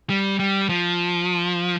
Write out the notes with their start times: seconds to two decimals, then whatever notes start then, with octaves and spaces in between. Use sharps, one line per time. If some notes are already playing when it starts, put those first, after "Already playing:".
0.10 G3
0.39 G3
0.69 F3